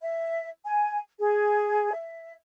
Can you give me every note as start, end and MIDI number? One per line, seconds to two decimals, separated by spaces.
0.01 0.48 76
0.64 0.98 80
1.19 1.91 68
1.93 2.32 76